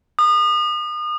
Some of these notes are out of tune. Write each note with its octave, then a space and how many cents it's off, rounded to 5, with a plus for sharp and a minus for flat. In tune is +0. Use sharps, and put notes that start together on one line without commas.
D#6 -35